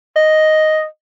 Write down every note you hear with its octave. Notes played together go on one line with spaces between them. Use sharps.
D#5